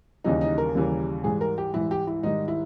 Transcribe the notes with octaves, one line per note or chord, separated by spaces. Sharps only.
D#2 C#3 E3 G3 D#4
D#4
A#4
D#2 C#3 E3 G3
G#2 E3 G3 G#4
A#4
G4
G#2 E3 G3 E4
G4
E4
G#2 D#3 G3 D#4
E4